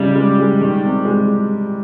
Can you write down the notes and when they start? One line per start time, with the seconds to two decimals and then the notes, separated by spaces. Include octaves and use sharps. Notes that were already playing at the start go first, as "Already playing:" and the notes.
Already playing: C#3 G3 D#4
0.15 G#3
0.39 G#3
0.61 D#3
0.84 C3
1.05 G#3